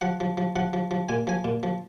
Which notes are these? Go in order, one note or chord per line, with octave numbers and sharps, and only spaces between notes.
F3 F#5
F3
F3
F3 F#5
F3
F3
A#2 G#5
F3 G#5
A#2
F3